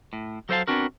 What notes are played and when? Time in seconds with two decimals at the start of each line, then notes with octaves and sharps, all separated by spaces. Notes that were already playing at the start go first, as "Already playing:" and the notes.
0.13 A2
0.49 F#3 A4 C5 D5 F5 A5
0.68 B3 C4 D4 F#4 A#4